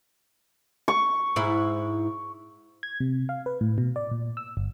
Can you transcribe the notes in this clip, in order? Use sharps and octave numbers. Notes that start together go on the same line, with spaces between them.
C#6
G#2 E4
G#6
C3
F5
B4
A2
B2
D5
A#2
E6
G1